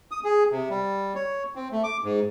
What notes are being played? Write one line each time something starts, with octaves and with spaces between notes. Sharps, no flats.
D#6
G#4
C3
G3
C#5
C4
A3
D6
G#2